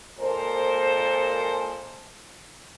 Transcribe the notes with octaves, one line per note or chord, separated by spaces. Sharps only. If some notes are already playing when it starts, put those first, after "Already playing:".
A#2 G#3 A4 A#4 C5